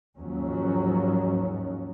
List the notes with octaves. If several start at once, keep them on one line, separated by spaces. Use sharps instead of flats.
D#2 G#2 F3 F#3 C#4